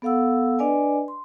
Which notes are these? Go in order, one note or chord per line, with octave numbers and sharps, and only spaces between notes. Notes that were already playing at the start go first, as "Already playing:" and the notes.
B3 A4 F5 F#5 E6
D4 B4 D5 D#5 G#5
C6